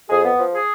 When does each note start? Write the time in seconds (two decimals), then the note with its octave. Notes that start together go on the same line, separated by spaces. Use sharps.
0.10 F2 G#4
0.24 B3
0.39 F3
0.54 G#4